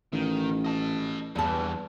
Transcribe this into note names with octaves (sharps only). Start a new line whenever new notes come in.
A1 D#3
D#5 A5
E2 G2 E3 A5